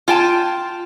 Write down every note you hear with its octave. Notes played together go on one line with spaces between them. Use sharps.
F4 G5 A5